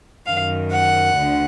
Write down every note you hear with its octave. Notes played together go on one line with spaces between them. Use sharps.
F#2 D#3 F5
F#5
D2 D3